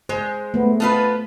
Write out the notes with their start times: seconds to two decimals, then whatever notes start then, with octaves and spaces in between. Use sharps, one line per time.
0.09 G#3 C5
0.54 A3 B3
0.80 B3 F4 B4 A5